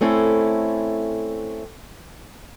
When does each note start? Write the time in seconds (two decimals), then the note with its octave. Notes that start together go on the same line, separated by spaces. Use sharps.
0.01 A3 C4 C#4 E4 A4